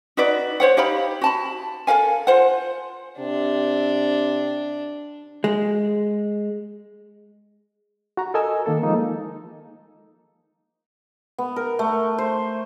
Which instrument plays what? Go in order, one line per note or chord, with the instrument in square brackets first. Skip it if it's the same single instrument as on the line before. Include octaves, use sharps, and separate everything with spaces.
[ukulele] D#4 F#4 B4 D5
C5 C#5 F#5
D#4 G4 F5 B5
F#4 A5 B5
A4 A#4 F5 G#5
F4 C5 F#5
[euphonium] C3 [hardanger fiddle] D4
[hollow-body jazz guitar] G#3
[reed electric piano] F#4 A#5
A4 A#4 D#5 G#5 E6
D#3 A#3 A4
F3 G#3 A#3 D#4
[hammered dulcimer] B3
A#4
A3
C5